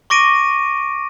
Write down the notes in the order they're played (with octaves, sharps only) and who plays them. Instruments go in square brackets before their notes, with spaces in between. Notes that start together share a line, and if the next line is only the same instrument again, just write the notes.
[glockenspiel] C#6 D6 A#6 D7 D#7